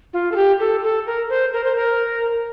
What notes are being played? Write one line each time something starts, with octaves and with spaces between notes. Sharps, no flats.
F4
A4
G4
A4
A4
A#4
C5
A#4
C5
A#4